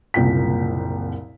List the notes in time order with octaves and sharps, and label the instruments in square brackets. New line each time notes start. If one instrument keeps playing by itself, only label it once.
[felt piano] F#1 C2 A#2 G5 B6